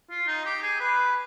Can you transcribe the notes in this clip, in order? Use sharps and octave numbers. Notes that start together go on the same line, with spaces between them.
F4
D#4
G4
G#4
B4